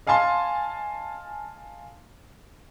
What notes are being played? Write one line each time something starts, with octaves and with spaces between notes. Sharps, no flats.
D#5 F5 G#5 A5 C6